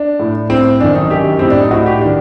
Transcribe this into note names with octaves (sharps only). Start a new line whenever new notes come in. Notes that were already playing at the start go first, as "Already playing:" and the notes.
Already playing: D4
A2
A2 C4
F#2 D#3 D4
D#4
F#2 D#3 G4
A2 C4
D4
D#4
A2 F#4
G4
D#3 D4